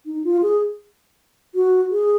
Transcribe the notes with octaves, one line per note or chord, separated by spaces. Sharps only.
D#4
F4
G#4
F#4
G#4